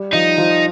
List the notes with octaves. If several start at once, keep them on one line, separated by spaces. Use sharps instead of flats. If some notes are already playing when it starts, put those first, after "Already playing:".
Already playing: G3 G4
F3 D#4 F4
F3 F4